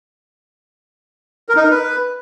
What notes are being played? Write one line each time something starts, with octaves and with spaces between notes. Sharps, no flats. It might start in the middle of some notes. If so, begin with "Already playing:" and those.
A#4
D#4
A#4
B4